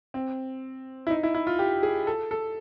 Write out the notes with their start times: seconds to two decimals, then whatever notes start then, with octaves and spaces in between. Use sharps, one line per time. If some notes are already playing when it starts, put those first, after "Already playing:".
0.14 C4
1.07 E4
1.10 D#4
1.23 E4
1.34 E4
1.47 F4
1.59 G4
1.83 G#4
2.07 A4
2.31 A4